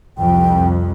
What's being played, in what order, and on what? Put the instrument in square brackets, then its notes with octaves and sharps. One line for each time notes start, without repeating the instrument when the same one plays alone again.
[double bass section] C2 F2 [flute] G5